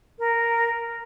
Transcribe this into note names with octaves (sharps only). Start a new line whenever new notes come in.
A#4